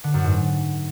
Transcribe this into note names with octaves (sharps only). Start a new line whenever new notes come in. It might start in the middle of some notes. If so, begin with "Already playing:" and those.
D3
F#2
G#2